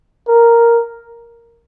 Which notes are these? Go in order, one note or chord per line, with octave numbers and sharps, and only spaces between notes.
A#4